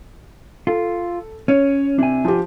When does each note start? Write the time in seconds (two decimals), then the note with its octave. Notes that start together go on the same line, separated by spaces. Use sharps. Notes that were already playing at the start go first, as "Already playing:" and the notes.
0.67 F4 A4
1.48 C#4 C#5
1.99 C3 D4 E4 G#5
2.25 F3 G4